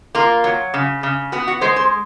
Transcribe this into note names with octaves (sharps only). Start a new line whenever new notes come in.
A#3 F4
F#3
C#3
C#3
B3 F#4
F#4
G#3 C5
C5